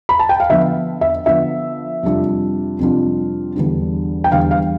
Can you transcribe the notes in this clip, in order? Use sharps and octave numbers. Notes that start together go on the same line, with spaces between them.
B5
A5
G5
F5
D3 F3 B3 E5
E5
D3 F3 B3 E5
F2 C3 G3 D4 F4
F2 C3 G3 D4 F4
E2 D3 G3 D4
G5
E2 D3 G3 D4 F5
F5